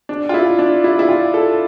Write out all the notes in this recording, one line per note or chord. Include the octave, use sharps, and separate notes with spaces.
D4
F4
E4
D4
E4
E4
F4
A4